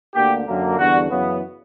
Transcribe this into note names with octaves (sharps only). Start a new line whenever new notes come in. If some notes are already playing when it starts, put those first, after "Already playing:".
D2 D3 A#3 G4
F#2 D3 A#3
E2 D3 G3 B3 F#4
F#2 C#3 E3 B3